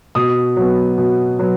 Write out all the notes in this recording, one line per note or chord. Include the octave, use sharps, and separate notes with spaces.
B2 D#6
F#3 B3
B2
F#3 B3